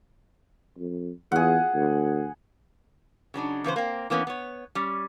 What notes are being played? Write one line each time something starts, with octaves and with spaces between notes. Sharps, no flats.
F2
E2 G#4 F#5
D2
C#3 F#3 D4 D#4
E2 C#3 B4 C5
A#3 C4
E3 A#3 B3 C#4
B3 C#5
G3 C#4